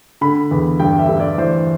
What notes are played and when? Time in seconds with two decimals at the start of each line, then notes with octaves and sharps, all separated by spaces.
0.21 D3 B5
0.51 E2
0.80 G2 G5
0.99 E5
1.09 G2
1.20 D5
1.38 E3 C5